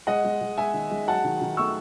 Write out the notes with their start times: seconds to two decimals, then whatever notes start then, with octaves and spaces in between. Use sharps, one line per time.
0.07 G#3 D#5 F#5
0.24 G#3
0.41 G#3
0.57 G#3 E5 G#5
0.74 D#3
0.91 G#3
1.07 F#3 F#5 A5
1.24 D#3
1.41 D#3
1.57 A3 C#6 E6